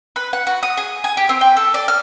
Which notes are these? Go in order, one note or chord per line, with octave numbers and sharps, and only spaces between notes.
B4
F#5
F#4
D#6
G#4
G#5
G4
C4
G5
A4
D5
F6